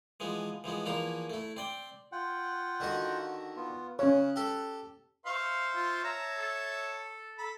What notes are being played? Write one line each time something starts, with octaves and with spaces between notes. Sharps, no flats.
E3 F3 G#3 B3
E3 F3 G#3 B3
E2 E3 F3 A#3 E4 A#5
A3 E4
C4 D5 G5
F4 F#5 G5
D3 D#3 F#4
B3 F4
C#3 C#4 C#5 F#6
G4 A4
C5 E5 F5 C#6
F4
C#5 E5 A5 A#5
A4
A4 A#5 B5